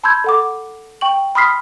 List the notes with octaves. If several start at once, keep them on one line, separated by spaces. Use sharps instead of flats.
A5 B5 C6 E6 G6 G#6
A4 F#5 D6
G5 C#6 F#7
B5 C6 D#6 F6 B6 C7